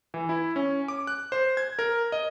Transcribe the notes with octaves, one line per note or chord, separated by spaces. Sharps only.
E3
E4
C#4
D6
F#6
C5
G#6
A#4
D#5